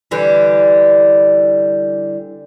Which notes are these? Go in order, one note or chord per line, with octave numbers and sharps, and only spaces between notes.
D3 E3 G3